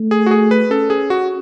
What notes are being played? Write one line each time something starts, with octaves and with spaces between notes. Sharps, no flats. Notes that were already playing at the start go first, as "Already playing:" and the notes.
Already playing: A3
G#4
F#4
G#4
B4
C#4 A4
G#4
F#4